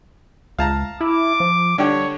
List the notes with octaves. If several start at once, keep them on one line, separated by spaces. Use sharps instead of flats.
C#2 F5 A5 A#5
E4 D6
F3
D3 G3 D4 G4 C#5